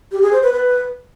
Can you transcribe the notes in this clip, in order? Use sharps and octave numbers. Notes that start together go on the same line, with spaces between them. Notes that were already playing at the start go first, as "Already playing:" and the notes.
G4
G#4
C5
B4
B4